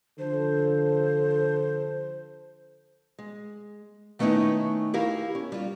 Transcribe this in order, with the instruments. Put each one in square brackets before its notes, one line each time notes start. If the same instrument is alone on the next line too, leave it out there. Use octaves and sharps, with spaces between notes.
[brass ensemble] D3 F3 A4 [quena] C5
[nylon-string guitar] G#3
D#3 A3 B3 C#4 D#4 E4
E4 G4 A#4 F5
C#4
G3 F4